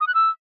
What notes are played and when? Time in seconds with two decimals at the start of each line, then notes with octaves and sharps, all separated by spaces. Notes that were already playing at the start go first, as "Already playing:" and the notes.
0.01 D#6
0.07 F#6
0.14 E6